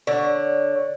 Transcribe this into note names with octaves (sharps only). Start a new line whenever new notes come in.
D3 C#5